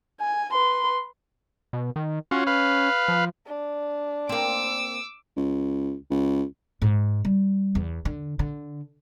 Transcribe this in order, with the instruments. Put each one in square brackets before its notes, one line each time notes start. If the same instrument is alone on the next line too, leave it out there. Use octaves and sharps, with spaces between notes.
[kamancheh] G#5
B4 C6
[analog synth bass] B2
D#3
[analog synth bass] C#4 [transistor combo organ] F4 F#4
[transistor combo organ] B4 F5
[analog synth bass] F3
[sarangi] D4
[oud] A#3 C4 [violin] D6 E6
[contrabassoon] C#2
C#2
[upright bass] G#2
G3
E2
D3
D3